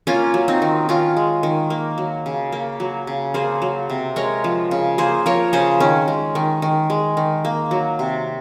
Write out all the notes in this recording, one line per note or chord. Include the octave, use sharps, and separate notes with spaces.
A#3 C#4 F4
F#3
C4 D#4
D#3
D#3 C#4 F4
G#3
D#3
A#3
F#3
C#3
A#3
F#3
C#3
A#3 G#4 C5
F#3
C3
G#3 A#4 C#5
F3
C#3
A#3 G#4 C5
F3 A#4 C#5
C#3 G#4 C5
D#3 C#4
G#3
D#3
D#3
G#3
D#3
A#3
F#3
C3